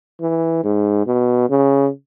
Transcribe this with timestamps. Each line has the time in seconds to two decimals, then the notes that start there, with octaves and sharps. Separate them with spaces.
0.21 E3
0.64 G#2
1.07 B2
1.50 C#3